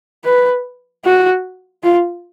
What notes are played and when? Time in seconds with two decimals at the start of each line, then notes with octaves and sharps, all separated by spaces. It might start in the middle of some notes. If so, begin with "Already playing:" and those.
0.25 B4
1.05 F#4
1.83 F4